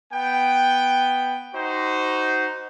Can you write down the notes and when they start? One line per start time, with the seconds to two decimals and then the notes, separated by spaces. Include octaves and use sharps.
0.13 B3 G5
1.53 D#4 F#4 C5